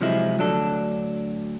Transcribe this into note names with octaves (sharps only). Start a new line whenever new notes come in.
C3 F3 F#3 G#3 E4
D2 F#3 D4 A4